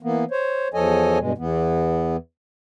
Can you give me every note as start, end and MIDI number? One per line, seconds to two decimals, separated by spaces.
0.03 0.24 52
0.03 0.24 58
0.03 0.24 59
0.31 0.68 72
0.31 0.68 73
0.74 1.18 40
0.74 1.18 53
0.74 1.18 69
0.74 1.18 73
0.74 1.18 75
0.74 1.18 80
1.19 1.33 43
1.19 1.33 47
1.19 1.33 56
1.38 2.17 40
1.38 2.17 52
1.38 2.17 59